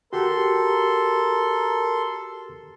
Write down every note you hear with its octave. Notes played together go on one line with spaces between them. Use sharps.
F#4 G4 A4 A#4 C6